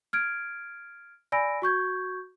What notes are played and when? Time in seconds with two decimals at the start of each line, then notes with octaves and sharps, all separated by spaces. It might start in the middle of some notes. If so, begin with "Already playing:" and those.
0.13 F6 G#6 D7
1.32 D5 G#5 B5 E6 A#6 D7
1.62 F#4 C#6 G6 G#6